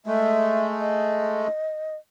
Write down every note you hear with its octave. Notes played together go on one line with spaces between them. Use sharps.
G#3 A3 E5
D#5